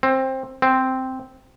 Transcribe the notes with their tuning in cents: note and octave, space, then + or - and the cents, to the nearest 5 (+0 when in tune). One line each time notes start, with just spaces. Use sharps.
C4 +15
C4 -5